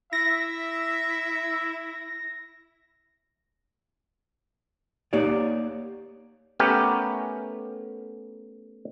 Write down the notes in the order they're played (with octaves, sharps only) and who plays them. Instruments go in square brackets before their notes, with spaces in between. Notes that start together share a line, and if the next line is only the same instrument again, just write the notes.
[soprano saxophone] E4 [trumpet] E5 [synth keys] A#6
[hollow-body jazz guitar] A#3 D#4 G4 C#5 D5
[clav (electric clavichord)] A3 B3 C#4 G4 A#4